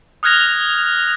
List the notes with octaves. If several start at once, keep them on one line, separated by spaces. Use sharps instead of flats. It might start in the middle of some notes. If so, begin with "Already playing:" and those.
D#6 F6 F#6 G#6 A#6 F7